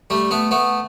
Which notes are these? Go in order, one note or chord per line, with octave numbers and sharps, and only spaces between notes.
G3 A3
A3 B3
A3 B3